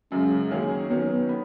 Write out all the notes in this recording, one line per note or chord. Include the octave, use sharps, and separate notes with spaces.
F#2 C#3 G#3 C#4
D#3 F#3 A#3 C#4 G#4
D#3 F#3 B3 C#4
B3